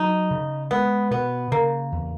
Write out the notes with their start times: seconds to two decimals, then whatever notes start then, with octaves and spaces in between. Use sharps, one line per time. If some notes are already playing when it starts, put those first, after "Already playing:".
Already playing: F#3 D#4
0.31 C#3
0.71 G#3 B3
1.11 B2 B3
1.52 C#3 A#3
1.92 E2